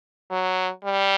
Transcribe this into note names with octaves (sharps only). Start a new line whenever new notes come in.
F#3
G3